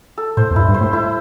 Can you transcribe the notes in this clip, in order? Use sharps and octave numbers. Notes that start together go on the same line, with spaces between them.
A4
A2 C5
E2
G2 E4
G2
C5
A2
A2 E4